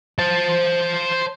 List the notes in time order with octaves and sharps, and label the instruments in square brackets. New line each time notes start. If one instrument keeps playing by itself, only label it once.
[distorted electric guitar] C5 A5